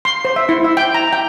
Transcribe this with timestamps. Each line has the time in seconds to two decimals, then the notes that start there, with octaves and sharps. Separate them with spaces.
0.05 C6
0.25 C5
0.36 E5
0.49 E4
0.64 E5
0.77 G5
0.94 A#5
1.13 G5